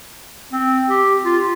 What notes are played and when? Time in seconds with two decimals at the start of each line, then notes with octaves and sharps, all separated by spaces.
0.52 C4
0.89 G4
1.25 F4